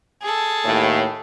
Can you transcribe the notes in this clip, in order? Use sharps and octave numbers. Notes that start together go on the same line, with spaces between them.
G#4 A4
D#2 A2